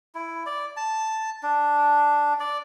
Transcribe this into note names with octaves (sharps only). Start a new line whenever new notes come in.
E4
D5
A5
D4
D5